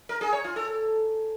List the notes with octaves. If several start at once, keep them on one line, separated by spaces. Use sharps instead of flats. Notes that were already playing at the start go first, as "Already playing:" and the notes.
A#4
G#4
C#5
F4
A4